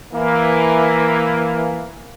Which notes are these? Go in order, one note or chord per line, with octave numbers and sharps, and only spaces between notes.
E3 A#3